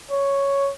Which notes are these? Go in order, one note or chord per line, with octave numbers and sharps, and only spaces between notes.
C#5